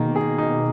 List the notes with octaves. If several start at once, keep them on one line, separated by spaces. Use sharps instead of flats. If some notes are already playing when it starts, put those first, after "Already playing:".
Already playing: B2 D#3 A#3 D#4 G#4
G#4
D#4